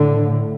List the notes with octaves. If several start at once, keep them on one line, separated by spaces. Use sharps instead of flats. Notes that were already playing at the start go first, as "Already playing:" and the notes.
Already playing: A2 D3